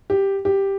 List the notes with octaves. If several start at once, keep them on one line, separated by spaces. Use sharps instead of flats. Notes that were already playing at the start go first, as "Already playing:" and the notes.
G4
G4